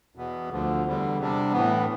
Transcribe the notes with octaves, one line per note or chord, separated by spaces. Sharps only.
E2 B2 B3
D2 D3 F3
E2 D3 G3
C3 G3 D4
A2 E3 B3